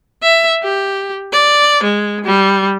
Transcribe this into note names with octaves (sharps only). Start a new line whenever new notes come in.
E5
G4
D5
G#3
G3